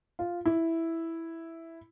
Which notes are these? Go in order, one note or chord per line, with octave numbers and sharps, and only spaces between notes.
F4
E4